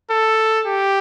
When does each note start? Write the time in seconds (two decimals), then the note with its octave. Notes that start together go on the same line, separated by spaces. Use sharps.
0.10 A4
0.66 G4